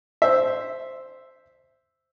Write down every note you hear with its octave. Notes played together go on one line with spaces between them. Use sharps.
C5 E5